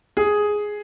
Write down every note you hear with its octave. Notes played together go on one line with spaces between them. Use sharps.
G#4